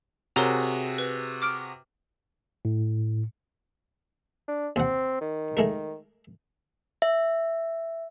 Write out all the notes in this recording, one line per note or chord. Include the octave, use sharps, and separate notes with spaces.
C3 F#4 G#4 A#4 C#5 A#5
B4
D6 F6 D7
A2
D4
D#2 C4 F#5
D#3
G#3 A3 A#4
E5